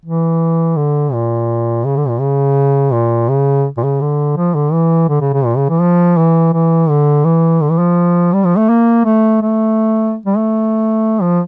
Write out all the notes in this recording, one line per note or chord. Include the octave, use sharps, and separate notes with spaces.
E3
D3
A#2
C#3
D3
A#2
C#3
A#2
C#3
A#2
C#3
D3
F3
D3
E3
D3
C#3
C#3
A#2
C#3
E3
F3
E3
E3
D3
E3
D3
E3
F3
G3
F3
A3
A#3
A3
A3
G3
A3
F3